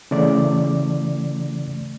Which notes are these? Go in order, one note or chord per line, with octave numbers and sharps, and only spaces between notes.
C#3 E3 A3 D5